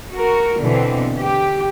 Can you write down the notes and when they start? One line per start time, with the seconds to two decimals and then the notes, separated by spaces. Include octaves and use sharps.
0.13 F#4 A#4
0.60 B2 D3 E3 C4
1.20 G4